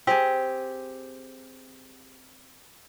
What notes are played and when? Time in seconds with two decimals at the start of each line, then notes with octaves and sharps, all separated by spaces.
0.07 C4 G4 G#4